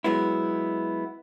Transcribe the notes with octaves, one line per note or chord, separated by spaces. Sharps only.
F#3 G#3 B3 E4